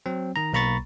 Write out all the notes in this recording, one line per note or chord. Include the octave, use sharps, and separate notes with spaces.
F#3 C4
D#3 A#5
B1 A#3 A#5 B5 C#6 A6